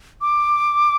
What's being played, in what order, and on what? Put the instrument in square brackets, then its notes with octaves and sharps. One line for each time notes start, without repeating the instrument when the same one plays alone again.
[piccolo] D6